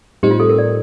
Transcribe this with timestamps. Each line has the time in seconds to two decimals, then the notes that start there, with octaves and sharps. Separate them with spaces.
0.23 A2 G3 C4 D#4 G4
0.31 F4
0.40 A4
0.50 A#4
0.58 D5